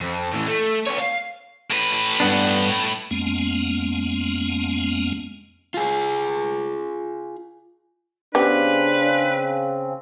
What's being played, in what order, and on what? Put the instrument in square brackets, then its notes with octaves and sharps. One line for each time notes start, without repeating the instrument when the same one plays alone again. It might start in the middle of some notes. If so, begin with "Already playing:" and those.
[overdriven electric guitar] F2
A2 E3
A3
B3 C#5
F5
[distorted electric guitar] A2 B4
[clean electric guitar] G2 B3 D4
[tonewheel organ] F2 G#3 A#3 B3 C#4
[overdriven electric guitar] F4 G#4
[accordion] C#3 C4 [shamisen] B3 G4 [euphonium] D4 [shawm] B4